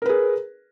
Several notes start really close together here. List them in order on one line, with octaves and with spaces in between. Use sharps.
A#4 B4 G#4